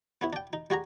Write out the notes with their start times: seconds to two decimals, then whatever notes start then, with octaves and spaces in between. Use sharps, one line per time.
0.21 B3 C#4 E4
0.33 D4 G5
0.53 D#4
0.70 G3 F#4 G#4 A#5